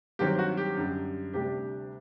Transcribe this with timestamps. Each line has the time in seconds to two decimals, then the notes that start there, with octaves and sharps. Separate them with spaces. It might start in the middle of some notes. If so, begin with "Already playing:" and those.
0.19 G2 D#3 F#3 C4 G4
0.39 F#4
0.57 G4
0.77 F#2 D3 G3
1.34 D2 C3 G3 D4 G4